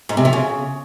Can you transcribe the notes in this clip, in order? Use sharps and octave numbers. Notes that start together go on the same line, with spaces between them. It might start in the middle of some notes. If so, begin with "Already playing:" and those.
G#2
C3
F3
C#3